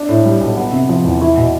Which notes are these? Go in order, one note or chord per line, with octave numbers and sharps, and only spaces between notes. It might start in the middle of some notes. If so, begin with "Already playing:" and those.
Already playing: D4
A2
G3
B1
B3
C3
F3
E2
E4
B2